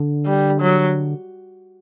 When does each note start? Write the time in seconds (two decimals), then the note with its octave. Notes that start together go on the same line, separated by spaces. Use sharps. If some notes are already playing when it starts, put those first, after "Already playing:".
Already playing: D3
0.26 G3
0.61 F#3